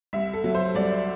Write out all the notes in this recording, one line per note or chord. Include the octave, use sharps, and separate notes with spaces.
C2 E5
A4
F#3
C5
C2 D5